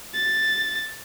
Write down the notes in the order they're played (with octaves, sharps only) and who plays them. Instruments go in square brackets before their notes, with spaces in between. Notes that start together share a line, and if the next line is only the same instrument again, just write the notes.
[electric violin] A6